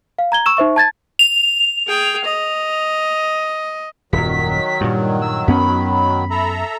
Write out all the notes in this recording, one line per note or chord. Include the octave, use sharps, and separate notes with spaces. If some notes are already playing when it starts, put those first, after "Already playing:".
F5
A#5 G#6 G7
C#6 E6 E7
D#4 C5 E5 C#6
A5 G#6 A6
F7
G#4 G5
D#5
D#1 F#2 D#3 F#3 B6
G2 A#2 G3
E6
F#2 B3 C#4 B5
A4 E5 A#5